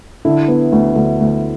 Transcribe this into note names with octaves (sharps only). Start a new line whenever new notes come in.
D3 E4
B3
D2
D2
D2